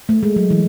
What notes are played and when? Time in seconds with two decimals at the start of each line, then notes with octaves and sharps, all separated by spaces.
0.09 A3
0.23 G#3
0.36 F#3
0.50 E3